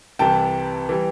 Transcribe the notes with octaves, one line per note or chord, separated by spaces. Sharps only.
C2 C3 E3 G3 G5 A5
E3 G3